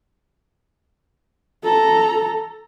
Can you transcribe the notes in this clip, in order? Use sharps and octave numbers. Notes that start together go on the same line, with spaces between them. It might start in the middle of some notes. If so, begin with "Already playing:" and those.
A4 A#5